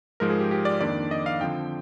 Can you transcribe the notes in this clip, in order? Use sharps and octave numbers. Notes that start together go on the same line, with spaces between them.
G#2 F3 G#3 A#4
G#4
G4
G4
D5
F2 D#3 A#3 D4 D5
D#5
F5
D3 F3 C4 G5